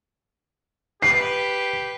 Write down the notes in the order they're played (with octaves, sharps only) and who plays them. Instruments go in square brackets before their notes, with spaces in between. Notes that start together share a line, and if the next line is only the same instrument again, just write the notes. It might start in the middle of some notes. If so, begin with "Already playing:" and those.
[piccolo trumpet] G4 [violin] B4 [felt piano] C7